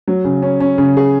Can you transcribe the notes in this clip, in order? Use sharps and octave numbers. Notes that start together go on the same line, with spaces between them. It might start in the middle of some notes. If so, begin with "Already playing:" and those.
F#3
C#3
C#4
C#4
C#3
G#4